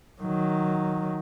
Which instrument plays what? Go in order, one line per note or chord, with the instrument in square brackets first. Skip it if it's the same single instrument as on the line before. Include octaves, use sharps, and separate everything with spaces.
[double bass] D#3 F#3